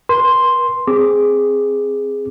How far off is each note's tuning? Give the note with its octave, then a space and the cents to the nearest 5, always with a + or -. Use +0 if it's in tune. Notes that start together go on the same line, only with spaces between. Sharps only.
B4 -45 C6 +0
C4 +0 G#4 +0 D6 +0